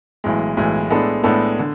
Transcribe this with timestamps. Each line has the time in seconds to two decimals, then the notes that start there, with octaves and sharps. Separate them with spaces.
0.24 B1 A2 E3 G#3
0.57 B1 A2 E3 G#3
0.90 A2 G#3 B3 D4 A4
1.23 A2 G#3 B3 D4 A4
1.59 D3